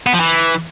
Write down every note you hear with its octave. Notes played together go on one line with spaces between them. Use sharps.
B3
F3
E3